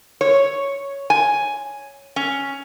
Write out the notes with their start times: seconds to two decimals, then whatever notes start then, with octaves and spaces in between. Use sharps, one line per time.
0.21 C#5
1.10 G#5
2.16 C#4